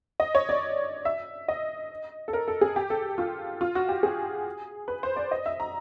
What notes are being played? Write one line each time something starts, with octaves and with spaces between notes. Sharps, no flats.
D#5
C#5
D5
E5
D#5
A4
A#4
A4
G#4
G4
A4
F4
F4
F#4
G4
G#4
B4
C5
D5
D#5
E5
A#5